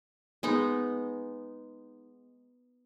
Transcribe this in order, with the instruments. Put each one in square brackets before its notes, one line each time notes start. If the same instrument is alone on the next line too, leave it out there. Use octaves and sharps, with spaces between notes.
[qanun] G#3 B3 D#4